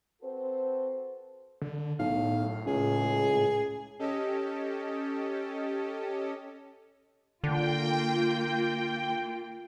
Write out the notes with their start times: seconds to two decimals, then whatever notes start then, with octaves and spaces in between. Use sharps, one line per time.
0.22 C4 F#4 A4 B4 C5
1.62 D3
1.99 B1 A2 F5
2.66 C#2 G#4
3.99 C#4 G4 A4 D#5
7.44 D3 A#3 F4 G5